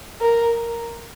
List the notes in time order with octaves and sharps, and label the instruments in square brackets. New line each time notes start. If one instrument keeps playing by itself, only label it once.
[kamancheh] A#4